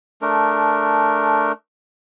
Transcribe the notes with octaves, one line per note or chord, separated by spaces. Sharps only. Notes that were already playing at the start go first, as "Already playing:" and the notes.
A3 D4 A#4